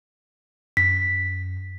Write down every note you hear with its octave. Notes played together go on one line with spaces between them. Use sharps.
F#2 B6